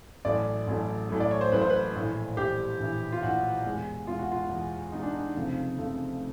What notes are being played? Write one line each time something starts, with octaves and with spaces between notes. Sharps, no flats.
A1 A2 F#3 A3 D5
A1 A2 F#3 A3
A1 A2 F#3 A3
D5
C#5
C5
A1 A2 F#3 A3 B4
C5
B4
A#1 A2 E3
A#1 A2 E3 G4
A#1 A2 E3
F4
A#1 A2 E3 F#4
E2 B2 G#3
E2 B2 G#3 F4
F#4
F4
E2 B2 G#3
E2 B2 G#3 D#4
D4
D#4
F1 F2 C#3 F3 A3
F1 F2 C#3 F3 A3